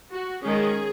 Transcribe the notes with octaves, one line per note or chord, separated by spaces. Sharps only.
F#4
D#3 G#3 C#4 G#4